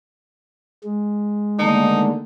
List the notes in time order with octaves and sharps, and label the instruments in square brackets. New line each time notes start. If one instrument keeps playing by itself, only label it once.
[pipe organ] G#3
[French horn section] D3 D#3 [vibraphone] A3 A#3 [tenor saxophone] D#4